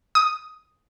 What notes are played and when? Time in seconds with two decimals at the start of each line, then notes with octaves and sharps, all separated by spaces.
0.15 D#6